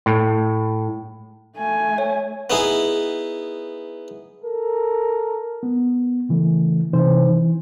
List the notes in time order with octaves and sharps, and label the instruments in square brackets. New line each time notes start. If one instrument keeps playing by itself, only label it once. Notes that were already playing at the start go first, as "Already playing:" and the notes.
[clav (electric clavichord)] A2
[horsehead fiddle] A3 G#5
[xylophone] C#5
[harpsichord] B3 D#4 E4 G#4
[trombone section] A4 A#4
[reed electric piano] B3
C#3 E3 A3
C3 E3 D#4 C5
E3